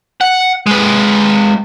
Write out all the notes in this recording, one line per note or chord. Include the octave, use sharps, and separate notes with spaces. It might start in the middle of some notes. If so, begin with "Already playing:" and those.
F#5
G#3 B4